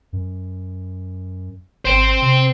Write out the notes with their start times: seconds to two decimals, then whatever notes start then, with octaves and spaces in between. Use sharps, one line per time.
0.13 F#2
1.85 G#1 C5 G5
2.22 C3